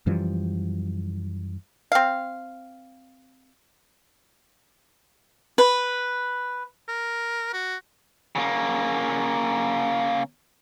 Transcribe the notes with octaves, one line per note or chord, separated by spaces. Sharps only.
F#2 E3 F3 G3
C4 F5
B4
A#4
F#4
C#3 A#3